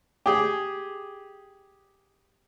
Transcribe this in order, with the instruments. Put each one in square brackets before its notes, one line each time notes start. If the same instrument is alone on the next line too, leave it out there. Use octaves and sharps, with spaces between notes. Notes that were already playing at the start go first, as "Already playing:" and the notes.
[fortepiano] G4 G#4